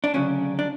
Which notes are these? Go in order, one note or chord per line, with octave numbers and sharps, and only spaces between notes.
D4
D2 C#3 F#3 C#4
D4